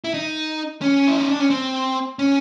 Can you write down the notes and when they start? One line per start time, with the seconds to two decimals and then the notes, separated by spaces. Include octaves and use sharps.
0.04 E4
0.14 D#4
0.82 C#4
1.08 E4
1.19 D#4
1.29 D4
1.40 C#4
1.50 C4
2.19 C#4